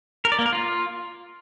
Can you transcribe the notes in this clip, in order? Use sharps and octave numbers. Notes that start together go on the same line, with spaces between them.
A#4
D5
A#3
A#4
F4